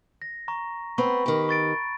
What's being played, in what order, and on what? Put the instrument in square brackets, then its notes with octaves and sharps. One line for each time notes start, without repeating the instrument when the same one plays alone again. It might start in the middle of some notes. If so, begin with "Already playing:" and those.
[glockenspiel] A#6
A#5 C#6
[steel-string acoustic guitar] B3 C4 [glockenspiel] B5 C#6
[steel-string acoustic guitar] D#3 G4
[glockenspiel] C#6 A6 D7